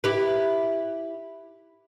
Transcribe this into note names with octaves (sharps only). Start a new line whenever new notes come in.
E4 G4 B4